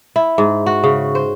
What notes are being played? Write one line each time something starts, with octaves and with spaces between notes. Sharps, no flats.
E4
G#2
F#4
C#3
C5